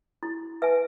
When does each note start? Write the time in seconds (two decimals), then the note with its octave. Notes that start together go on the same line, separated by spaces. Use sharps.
0.23 E4
0.62 B4 E5 G#5